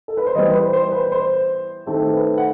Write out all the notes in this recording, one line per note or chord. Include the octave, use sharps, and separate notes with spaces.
A4
B4
C5
E3 G3 B3 D#5
B4
C5
C5
B4
C5
D#3 A3 C4
B4
F#5